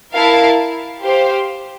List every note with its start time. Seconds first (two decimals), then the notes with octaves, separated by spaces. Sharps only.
0.13 E4 A#4 F5 A5
1.01 G4 C5 F5